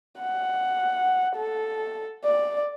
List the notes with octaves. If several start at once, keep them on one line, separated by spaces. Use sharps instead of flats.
F#5
A4
D5